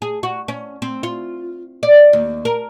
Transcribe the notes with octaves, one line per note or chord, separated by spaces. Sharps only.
G#4
F#4
C#4
C4
F4
D5
D#2
A#4